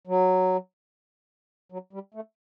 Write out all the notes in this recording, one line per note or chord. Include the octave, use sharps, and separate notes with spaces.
F#3
F#3
G3
A3